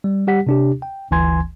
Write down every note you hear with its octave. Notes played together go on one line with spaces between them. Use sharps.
G3
G3 G4 F#5 B6
C3 D4 G4
G5
G1 D2 E3 G#5 C6 G#6